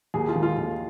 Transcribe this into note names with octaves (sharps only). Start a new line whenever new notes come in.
D#2 G#4
F4
D#3 G#3
F4
D#2 F4